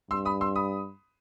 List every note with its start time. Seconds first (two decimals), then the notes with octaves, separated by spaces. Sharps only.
0.11 G2 C6 E6
0.25 B5 D#6
0.41 C6 E6
0.55 B5 D#6